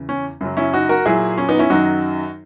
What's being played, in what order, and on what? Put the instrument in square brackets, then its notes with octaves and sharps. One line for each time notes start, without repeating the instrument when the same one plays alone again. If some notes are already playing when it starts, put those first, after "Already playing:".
Already playing: [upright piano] E2 C#3 E3
C#4
F#2 C#3 F#3
C#4 E4
D#4 F#4
F#4 A#4
A#2 F#3 E4 G#4
C#4
B3 D#4
C#4 E4
F#2 D#3 F#3 D#4 F#4